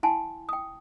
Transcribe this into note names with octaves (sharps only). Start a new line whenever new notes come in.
E4 F#5 G#5 A5 C6
G5 D#6